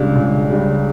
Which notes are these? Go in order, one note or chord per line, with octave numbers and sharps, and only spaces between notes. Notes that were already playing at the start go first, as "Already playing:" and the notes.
Already playing: C#2 C#3 G3 D4
C#2
C#3 G3 D4